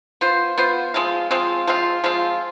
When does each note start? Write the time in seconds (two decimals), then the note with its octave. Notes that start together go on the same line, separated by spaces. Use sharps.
0.21 B3 F4 C5
0.58 B3 F4 C5
0.94 F3 G#3 C4 F4
1.31 F3 G#3 C4 F4
1.67 F3 G#3 C4 F4
2.04 F3 G#3 C4 F4